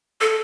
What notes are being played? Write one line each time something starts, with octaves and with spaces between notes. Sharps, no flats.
A4